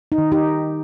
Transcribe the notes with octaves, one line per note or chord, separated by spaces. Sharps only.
D#4
D#3
D#4 G4